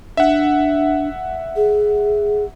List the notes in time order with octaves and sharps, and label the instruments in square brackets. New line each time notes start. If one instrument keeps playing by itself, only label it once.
[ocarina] D4 [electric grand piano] E5 F#5
[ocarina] G#4